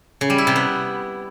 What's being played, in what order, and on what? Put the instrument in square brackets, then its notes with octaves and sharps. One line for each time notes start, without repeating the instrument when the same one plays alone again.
[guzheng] C#3
G3
E4
C3
B3